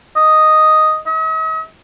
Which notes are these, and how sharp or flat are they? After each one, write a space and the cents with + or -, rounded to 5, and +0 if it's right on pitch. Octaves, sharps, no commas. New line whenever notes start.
D#5 +0
D#5 +45